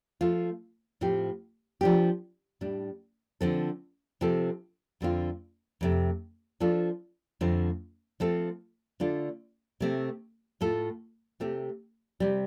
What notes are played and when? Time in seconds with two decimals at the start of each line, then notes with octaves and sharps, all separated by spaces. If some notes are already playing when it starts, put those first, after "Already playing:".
0.21 F3 A3 F4
1.01 A2 F3 C4 G4
1.81 F3 D4 G4
2.61 A2 G3 D4
3.41 D3 F3 C4 A4
4.21 C3 F3 C4 A4
5.01 F2 D3 A3 C4 F4
5.81 F2 C3 A3
6.60 F3 D4 F4 A4
7.41 F2 D3 F3 A3 C4
8.20 F3 A3 C4 A4
9.00 D3 A3 D4 F4 A4
9.80 C3 A3 C4
10.61 A2 A3 F4 A4
11.40 C3 A3 C4 G4
12.20 C3 G3